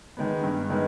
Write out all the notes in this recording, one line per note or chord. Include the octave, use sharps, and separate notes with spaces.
D#3 G#3 B3
G2
D#3 G#3 B3